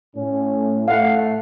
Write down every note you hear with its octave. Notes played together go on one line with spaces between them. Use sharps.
A2 C#4
A3 F5 F#5